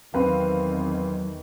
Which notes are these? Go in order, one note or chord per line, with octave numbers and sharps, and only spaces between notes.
E2 D#3 F#3 C4 B4 F5